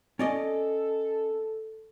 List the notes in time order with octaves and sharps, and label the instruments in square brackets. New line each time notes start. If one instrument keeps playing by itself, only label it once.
[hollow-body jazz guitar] C#4 D5 D#5 [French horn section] A4